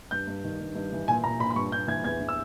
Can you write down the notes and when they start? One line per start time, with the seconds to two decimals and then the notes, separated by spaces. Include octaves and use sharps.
0.11 G2 G6
0.27 G2
0.44 D#3
0.60 G2
0.75 G2
0.92 E3
1.08 A#2 G#5
1.24 A#2 A#5
1.40 A#2 B5
1.50 B5
1.56 G2 C#6
1.72 G2 G6
1.88 E3 G#6
2.04 E2 G#6
2.21 E3
2.29 E6